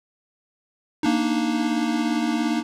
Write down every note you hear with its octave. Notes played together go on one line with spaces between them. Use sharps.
A#3 D4 D#4